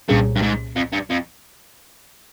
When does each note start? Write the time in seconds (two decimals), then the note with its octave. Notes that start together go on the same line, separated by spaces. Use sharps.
0.09 C2 G2 A#2 G3 C#4 G#4
0.36 G2
0.42 G#2
0.76 F2
0.92 G2
1.10 F2